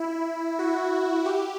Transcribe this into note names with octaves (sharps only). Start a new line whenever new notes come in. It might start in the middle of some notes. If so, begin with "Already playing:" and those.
Already playing: E4
F#4
G4